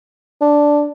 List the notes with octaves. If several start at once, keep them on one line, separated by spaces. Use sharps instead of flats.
D4